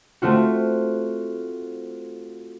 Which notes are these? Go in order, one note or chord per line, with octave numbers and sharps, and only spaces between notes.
A3 C4 F4 F#4